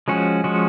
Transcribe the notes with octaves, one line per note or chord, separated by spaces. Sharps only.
F3 G#3 C#4 F#4
F3 G#3 C#4 F#4